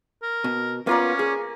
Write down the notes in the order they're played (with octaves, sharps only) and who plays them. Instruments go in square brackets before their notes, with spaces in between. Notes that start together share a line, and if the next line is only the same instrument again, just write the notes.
[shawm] A#4
[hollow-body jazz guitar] B2
[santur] A#3 D5 [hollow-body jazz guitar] B3 F4 [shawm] C#4
[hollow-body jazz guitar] G#4